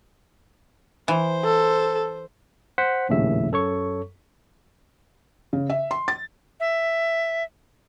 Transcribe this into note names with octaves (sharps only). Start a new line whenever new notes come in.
E3 C5
A4
C5 F#5 B6
A#1 D#2 A2 C#3 E5
F#2 A4 C#5 C#6
C#3
E5
C6
A6
E5